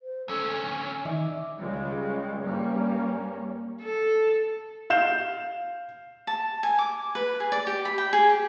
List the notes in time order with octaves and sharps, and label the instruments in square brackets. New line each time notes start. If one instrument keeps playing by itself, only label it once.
[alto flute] C5
[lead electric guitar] D2 C#4 [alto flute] A4 [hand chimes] E6
[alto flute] G#5
[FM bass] D#3 [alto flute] D#4 [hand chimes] D5 E5 D6
[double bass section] C#2 C#3 G3 G#3
G2 G3 A#3 C#4
[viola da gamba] A4
[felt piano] F5 G6 E7
[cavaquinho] A5
G#5
D6
B4
G#4
D5
G4
B5
G5
G#4
G4